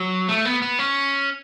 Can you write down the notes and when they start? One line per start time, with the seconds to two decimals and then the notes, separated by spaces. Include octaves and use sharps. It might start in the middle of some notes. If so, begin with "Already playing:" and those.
Already playing: F#3
0.29 A3
0.45 B3
0.62 B3
0.79 C#4